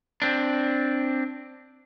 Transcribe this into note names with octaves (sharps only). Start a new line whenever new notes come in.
C4 D4